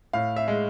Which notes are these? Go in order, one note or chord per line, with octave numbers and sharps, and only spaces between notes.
A2 F5
E5
G#3